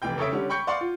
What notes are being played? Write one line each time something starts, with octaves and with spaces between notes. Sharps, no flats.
F1 E3 G5 G6
C#3 A4 C#5 E5 D7
D3 G3 C#4
G5 B5 C#6 G6 C#7
D5 F5 F#5 C6 C#6
F4